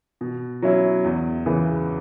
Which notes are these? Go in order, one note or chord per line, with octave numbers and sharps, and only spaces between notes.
B2
F#3 C#4 E4
E2
C#3 E3 B3